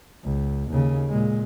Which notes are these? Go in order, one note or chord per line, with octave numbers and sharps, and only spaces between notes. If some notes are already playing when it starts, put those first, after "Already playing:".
C#2
D#2 C#3
A#2 G#3